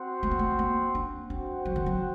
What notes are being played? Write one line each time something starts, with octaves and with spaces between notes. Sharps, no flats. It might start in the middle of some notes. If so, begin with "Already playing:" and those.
Already playing: C4 F#4 C5 F#5
A3
A#3
A3
A#3
D4
C4 D4 F#4 C5 F#5
F#3
D#3
F#3